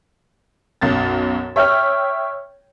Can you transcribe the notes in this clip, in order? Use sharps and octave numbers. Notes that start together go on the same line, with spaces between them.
B1 F#2 A6
C#5 E5 G5 F6